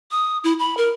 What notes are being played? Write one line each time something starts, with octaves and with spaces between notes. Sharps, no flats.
D#6
E4
B5
A#4